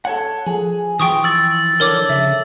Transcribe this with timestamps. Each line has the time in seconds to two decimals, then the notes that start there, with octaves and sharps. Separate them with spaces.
0.05 A4 C#5 F#5
0.46 F3 G#4
1.00 E3 F4 G5 C#6 D#6
1.24 E6 A6
1.80 D3 A#4 C#5 D6
2.09 C#3 E5